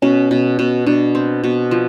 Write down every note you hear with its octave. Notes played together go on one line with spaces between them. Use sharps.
B2 C#4
B2
B2
B2 D4
C4
B2
F3